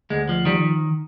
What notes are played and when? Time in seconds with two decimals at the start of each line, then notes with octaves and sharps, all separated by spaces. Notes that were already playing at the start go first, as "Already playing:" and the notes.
0.10 D2 G#3
0.29 F3
0.45 D#3 G3